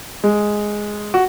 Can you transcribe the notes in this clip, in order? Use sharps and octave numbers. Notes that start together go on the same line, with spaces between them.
G#3
F#4